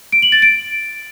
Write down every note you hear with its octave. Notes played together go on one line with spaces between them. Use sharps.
D7
F#7
A6
D7